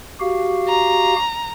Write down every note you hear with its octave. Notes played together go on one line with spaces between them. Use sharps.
F#4 G4 F5
A#5